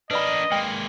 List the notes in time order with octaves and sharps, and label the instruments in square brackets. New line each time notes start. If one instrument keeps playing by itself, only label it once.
[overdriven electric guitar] D4 A#4 [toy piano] B4 D5 B5 [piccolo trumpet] D#5
[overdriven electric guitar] G#3 A#3 [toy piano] G5